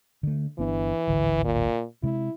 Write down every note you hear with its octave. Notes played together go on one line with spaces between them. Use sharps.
D3 A3
G1 E3 B3 D4
D1 G#1 D3
A#2
C3 G#3 E4